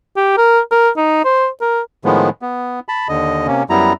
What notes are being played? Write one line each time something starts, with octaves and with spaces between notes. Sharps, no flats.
G4
A#4
A#4
D#4
C5
A#4
A2 D#3 F3 G#3 B3
B3
A5 B5
D#2 D3 D#5
C3 A#3 C#4
F#2 G3 B3 E4 A#5